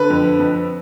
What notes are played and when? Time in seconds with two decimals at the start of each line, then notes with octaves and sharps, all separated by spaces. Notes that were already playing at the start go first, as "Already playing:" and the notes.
Already playing: D3 B4
0.10 F2
0.39 F2